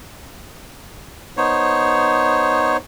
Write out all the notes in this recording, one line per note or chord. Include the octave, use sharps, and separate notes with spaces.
B3 D#4 C5 C#5